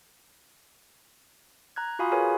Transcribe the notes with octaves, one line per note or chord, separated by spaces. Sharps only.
A#5 F#6 G#6
F4 F#4 F5 G#5 B5 D#6
G#4 A#4 B4 C#5 G#5 B5